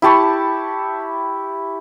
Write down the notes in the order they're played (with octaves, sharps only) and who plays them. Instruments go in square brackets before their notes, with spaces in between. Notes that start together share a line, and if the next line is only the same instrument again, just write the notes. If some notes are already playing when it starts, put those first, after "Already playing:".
[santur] E4 G4 A5 C#6